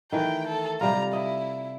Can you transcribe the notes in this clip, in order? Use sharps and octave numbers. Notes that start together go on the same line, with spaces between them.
D#3 E3 A3 G5
A4
C3 G3 F4 A#5
E4 D#5